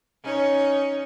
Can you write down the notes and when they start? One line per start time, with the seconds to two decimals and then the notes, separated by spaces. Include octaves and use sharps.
0.24 C#4 D#4 C#5